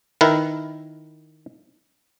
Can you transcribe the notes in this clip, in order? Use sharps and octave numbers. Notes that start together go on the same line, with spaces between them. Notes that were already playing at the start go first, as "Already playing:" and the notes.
D#3 E4 A#4 B4